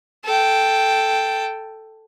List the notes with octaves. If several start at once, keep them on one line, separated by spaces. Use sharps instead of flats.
A4 G5